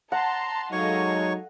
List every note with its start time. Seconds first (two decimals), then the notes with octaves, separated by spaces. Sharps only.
0.12 F#5 A5 A#5 C6
0.72 F#3 G#3 D#4 A4 C#5 D#5 F5 C#6